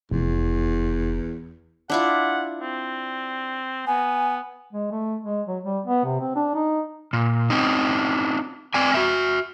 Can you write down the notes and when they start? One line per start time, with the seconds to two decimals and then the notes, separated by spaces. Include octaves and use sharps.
0.11 F1 E2
1.90 D4 E4 F4 F#5
2.61 C4
3.86 B3 G#5
4.73 G#3
4.91 A3
5.23 G#3
5.48 F#3
5.64 G3
5.86 B3
6.05 C3
6.21 C4
6.36 D4
6.55 D#4
7.13 A#2
7.50 C4 C#4 D#4
8.74 C4 D5 G#5
8.94 F#4 E5